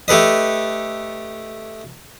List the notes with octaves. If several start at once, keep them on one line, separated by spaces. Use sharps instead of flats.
A3 G4 A4 B4 D#5